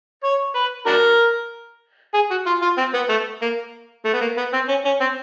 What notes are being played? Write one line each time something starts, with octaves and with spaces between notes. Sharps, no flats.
C#5
B4
D4 F#4 A#4
G#4
F#4
F4
F4
C4
B3
A3
A#3
A3
B3
A#3
B3
C4
C#4
C#4
C4